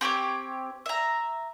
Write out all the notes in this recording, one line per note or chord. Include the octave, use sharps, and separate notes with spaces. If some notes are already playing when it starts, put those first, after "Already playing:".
C4 G4 C#5 D6
E5 A#5